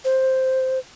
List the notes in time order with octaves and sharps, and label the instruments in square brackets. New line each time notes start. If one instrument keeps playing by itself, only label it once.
[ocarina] C5